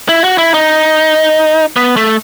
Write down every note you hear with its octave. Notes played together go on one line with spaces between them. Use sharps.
E4
F#4
E4
D#4
B3
A3